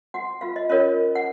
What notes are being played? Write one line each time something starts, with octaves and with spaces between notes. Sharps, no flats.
F#4 F#5
F4 F5
D#5
C#4 F4 A#4 C#5 D#5
F#5